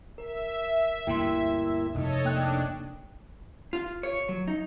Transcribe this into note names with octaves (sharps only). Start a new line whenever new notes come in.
A#4 E5
D2 G2 A#3 E4 G5 C6
F1 D#4 A4 C#5 D#5
A#3 D4 G5 F#6
F4
C#5
F#3
D#4